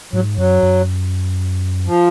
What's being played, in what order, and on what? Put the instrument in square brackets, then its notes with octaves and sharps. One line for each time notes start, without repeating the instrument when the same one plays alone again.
[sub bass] G#2 [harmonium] F#3
[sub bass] F#2 [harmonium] F#3
[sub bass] F#2
[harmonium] F3